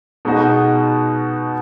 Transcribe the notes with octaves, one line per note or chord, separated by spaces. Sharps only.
B2 G#3 D#4 F#4